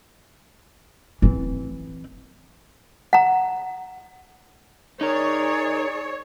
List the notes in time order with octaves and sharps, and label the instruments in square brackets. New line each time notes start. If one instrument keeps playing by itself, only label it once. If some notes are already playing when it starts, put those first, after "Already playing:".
[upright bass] E3 C4
[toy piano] F#5 A#5
[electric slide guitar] D#4 A#4 [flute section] G#4 D5 [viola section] C#5